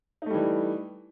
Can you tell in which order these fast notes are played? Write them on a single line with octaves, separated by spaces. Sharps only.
D#4 A3 G3 E3